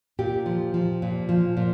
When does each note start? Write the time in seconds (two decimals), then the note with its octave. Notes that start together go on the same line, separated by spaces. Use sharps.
0.19 A#2 G4
0.46 F3
0.74 F3
1.02 A#2
1.29 F3
1.57 A#2